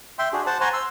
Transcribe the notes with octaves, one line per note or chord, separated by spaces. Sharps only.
E5 G5 C6
D4 F#4 G#4
C5 F#5 A5
C5 F#5 G#5 A#5 C6 C#6
C6 E6